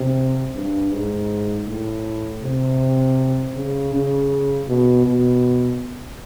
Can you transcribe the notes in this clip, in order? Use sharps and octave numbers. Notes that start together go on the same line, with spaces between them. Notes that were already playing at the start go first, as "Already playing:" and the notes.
Already playing: C3
G2
G#2
A2
C3
C#3
C#3
B2
B2